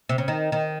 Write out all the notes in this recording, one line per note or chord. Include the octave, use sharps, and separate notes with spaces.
C3
C#3
D#3
D#3